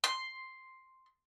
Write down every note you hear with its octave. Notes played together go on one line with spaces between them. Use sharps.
C6